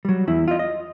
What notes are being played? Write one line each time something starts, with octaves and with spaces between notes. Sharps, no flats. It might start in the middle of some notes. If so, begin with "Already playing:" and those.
F#3 G3
E2 E4
F4 D#5
D#5